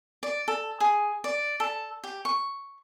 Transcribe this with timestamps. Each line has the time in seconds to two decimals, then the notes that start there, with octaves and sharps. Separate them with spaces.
0.23 D5
0.48 A4
0.80 G#4
1.24 D5
1.60 A4
2.04 G4
2.25 C#6